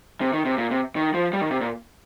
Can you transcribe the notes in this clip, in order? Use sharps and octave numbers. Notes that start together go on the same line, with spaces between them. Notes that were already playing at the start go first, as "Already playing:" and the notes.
C3
D#3
C3
A#2
C3
D#3
F3
G3
D#3
C3
A#2